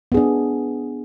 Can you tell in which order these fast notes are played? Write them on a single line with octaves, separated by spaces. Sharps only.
B3 G#4 D4